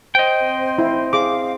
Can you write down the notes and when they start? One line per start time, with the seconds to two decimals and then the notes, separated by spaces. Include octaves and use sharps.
0.15 C5 D#5 G5
0.44 C4
0.78 E4
1.13 G#4 F5 D6